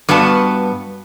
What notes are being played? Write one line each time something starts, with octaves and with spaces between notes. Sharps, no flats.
G2 B3 F#4 F5 A5